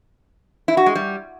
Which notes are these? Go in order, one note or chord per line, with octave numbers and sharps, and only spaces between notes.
E4
F#4
G#3
G3